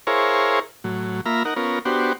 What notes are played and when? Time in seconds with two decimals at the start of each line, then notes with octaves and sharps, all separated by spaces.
0.07 E4 G#4 A#4 C5 C#5 F5
0.84 A2 F#3
1.26 A#3 F4 E5 A#5 B5 F6
1.45 D#4 A#4 F#5
1.56 B3 C#4 F4 A#4
1.85 B3 D4 F#4 G4 C5